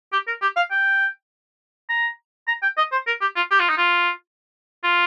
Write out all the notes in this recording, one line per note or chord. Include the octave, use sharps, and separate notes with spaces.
G4
A#4
G4
F5
G5
A#5
A#5
G5
D#5
C5
A#4
G4
F4
G4
F4
D#4
F4
F4